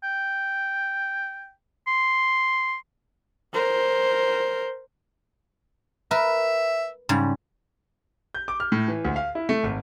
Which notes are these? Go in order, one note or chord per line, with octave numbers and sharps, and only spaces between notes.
G5
C6
A#4 C5
A#4 B4 E5
G#2 C#3 G3
G6
D6
F6
A2
E3
D2
F5
E4
A3
G#1